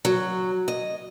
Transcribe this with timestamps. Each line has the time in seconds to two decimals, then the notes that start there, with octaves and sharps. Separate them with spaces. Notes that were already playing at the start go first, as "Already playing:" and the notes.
0.05 F#3
0.68 D#5